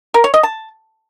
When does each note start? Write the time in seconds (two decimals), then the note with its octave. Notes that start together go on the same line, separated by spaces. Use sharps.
0.14 A#4
0.24 C#5
0.34 D#5
0.43 A5